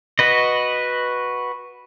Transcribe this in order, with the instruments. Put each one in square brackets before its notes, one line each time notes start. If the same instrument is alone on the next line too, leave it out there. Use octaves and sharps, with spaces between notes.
[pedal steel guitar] F#4 B4 D#5